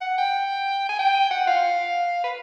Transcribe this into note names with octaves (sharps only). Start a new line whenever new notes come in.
F#5
G5
G#5
G5
F#5
F5
B4